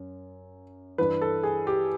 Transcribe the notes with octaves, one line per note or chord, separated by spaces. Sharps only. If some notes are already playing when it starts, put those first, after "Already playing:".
Already playing: F#2
G2 E3 B4
A4
G#4
G4